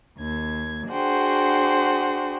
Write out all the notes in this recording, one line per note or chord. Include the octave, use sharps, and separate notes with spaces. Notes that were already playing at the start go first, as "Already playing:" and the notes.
D#2 G#6
D4 F#4 G#4 C5 F#5 G5